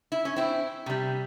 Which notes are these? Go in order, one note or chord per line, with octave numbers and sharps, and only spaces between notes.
E4
C#4
C4 E4
C3 G3